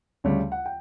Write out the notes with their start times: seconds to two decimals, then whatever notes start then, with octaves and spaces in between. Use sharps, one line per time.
0.24 D2 C#3 G3 C#5
0.52 F#5
0.66 G5